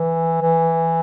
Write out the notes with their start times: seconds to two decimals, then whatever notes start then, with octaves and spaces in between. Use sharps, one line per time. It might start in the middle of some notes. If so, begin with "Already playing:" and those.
Already playing: E3
0.42 E3